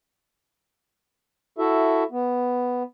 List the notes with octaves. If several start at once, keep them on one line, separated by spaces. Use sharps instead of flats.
E4 F#4 A4 E5
B3